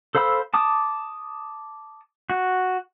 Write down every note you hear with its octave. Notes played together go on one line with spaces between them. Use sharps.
A4 C5 F5 B5 E6
A5 D6 D#6
F#4